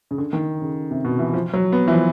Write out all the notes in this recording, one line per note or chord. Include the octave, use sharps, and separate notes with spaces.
C#3
D3
D#3
C#3
C3
B2
E3
F3
F#3
B3
E3
F3